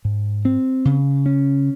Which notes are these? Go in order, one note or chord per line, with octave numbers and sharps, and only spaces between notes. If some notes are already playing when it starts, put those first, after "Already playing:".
G#2
C4
C#3
C#4